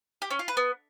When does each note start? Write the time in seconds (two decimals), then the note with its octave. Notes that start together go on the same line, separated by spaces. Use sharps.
0.22 G4
0.30 C#4
0.39 F4
0.48 B4
0.57 B3